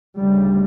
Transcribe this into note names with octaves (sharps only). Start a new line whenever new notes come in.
D2 C#3 G3